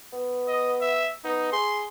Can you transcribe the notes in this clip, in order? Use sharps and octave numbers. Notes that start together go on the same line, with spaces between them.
B3
D#5
E5
B3 D#4
G#4 C6